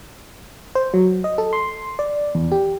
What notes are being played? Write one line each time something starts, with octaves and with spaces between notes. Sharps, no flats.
C5
F#3
D#5
A4
C6
D5
E2
G4